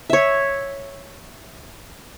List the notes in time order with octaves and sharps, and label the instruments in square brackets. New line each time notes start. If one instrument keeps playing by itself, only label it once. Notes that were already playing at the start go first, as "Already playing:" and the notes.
[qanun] C#5 E5